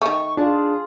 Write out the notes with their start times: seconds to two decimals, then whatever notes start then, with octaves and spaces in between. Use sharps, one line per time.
0.02 D#3 A3 C#6
0.37 D4 F4 G#4 A5